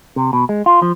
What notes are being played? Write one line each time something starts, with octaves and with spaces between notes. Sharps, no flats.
C3
B2
G#3
F4
F3